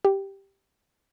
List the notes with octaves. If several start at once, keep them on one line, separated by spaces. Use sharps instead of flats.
G4